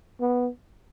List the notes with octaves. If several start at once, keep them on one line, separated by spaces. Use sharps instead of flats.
B3